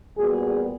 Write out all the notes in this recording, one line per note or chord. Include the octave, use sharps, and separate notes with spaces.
A#2 G3 B3 F#4 G#4